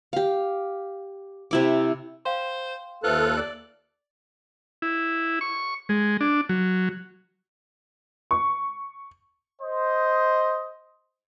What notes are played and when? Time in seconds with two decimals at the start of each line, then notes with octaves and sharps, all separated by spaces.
0.13 G4 F5
1.51 C3 E4 D6
2.25 C5 F5 G5 C6
3.04 D#2 F4 A4 B4 C5 E5 F#6
3.37 D5 F#7
4.82 E4
5.41 C#6
5.89 G#3
6.21 D4
6.49 F#3
8.31 C#6
9.61 C5 D#5